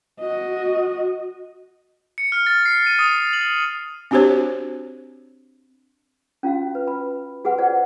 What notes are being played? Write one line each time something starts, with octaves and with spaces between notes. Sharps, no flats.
F#4 D#5
C#7
F6
A6
C7
D#7
D#6
F#7
C4 D4 F#4 G4 C5 C#5
C#4 F4 F#4 F5
B4
B5
F#4 G#4 B4 F#5
F4 G#4 C5 D5 F#5